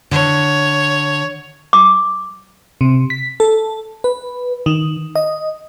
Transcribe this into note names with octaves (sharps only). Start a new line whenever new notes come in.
D3 C#5
D6
C3
B6
A4
B4
D#3
D#5